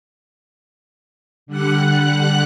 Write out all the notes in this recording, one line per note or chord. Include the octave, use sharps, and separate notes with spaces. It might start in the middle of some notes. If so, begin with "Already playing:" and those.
D3 G3 F#5 F#6